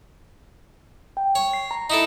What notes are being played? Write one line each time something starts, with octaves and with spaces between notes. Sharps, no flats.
G5
C#5
C7
A#5
D#4 E4 A4